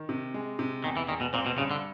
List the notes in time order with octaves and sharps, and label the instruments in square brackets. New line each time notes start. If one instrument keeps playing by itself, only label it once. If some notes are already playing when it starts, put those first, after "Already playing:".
Already playing: [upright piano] D#3
C3
G#3
C3
[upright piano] E2 [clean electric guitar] D#3
[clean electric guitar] E3
[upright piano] E2 [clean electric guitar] D#3
[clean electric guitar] B2
[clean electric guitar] A#2 [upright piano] C4
[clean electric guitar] B2
[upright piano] G2 [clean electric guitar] C#3
[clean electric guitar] D3